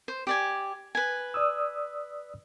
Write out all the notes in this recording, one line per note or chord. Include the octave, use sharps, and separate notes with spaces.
C5
G4 D5 G#5
B4 G#5
D5 D#6 E6